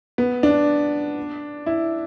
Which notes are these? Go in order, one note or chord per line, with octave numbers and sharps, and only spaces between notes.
B3
D4
E4